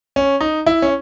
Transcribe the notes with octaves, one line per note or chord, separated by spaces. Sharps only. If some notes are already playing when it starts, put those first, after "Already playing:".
C#4
D#4
E4
C#4